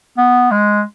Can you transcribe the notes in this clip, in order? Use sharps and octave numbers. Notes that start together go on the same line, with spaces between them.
B3
G#3